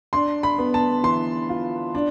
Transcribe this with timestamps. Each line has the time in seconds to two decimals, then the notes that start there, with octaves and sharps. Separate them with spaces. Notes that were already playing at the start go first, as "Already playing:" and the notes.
0.13 D4 C6
0.43 B5
0.58 B3
0.74 A5
1.03 E3 C6
1.49 F4
1.95 D4